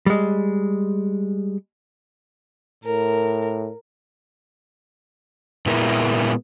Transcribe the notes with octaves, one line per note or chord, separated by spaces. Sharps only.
G3 G#3
A2 A#4
A#2 G#3 B3 E4 A#4